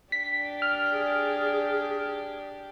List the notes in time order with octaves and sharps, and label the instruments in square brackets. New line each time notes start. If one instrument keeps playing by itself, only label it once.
[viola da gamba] D4 G4 D5 [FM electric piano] B6
[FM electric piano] F6
[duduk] G#4